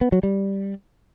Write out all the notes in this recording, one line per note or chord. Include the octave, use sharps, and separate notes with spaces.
B3
F#3
G3